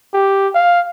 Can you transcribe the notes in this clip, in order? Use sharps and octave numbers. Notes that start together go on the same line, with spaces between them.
G4
F5